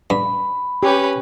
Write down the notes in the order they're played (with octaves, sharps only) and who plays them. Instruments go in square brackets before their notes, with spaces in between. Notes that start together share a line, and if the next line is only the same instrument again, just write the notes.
[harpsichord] G2 [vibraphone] B5
[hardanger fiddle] C#4 B4 [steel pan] G4